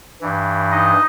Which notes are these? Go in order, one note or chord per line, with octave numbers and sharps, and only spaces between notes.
G2 E3
D#4 D#5